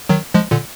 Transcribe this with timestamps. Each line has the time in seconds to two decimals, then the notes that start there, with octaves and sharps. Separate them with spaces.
0.09 D#3 F#3
0.34 F3 G#3
0.51 A#2 D3